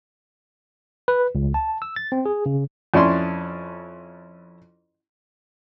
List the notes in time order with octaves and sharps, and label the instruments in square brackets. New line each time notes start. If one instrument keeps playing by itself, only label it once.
[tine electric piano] B4
C#2
A5
E6
A6
C4
G#4
C#3
[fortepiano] F2 C#4 E4 D5 C6